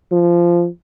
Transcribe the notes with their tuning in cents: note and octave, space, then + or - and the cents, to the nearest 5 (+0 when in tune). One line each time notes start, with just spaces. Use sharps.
F3 -15